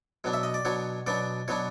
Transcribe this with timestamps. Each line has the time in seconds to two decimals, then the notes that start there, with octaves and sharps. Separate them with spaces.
0.24 B2 F#3 B3 D4
0.33 E5
0.43 D#5
0.54 D5
0.65 B2 F#3 B3 D4 C#5
1.07 B2 F#3 B3 D4 D5
1.48 B2 F#3 B3 D4 C#5